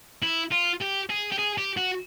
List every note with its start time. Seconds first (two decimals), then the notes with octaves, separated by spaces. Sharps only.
0.23 E4
0.51 F4
0.81 G4
1.10 G#4
1.32 G4
1.38 G#4
1.58 G4
1.77 F#4